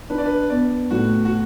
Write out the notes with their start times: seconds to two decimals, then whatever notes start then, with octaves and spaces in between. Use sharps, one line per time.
0.10 D4 B4
0.18 D5
0.26 B4
0.50 B3 D5
0.91 A2 F#4
1.25 F#4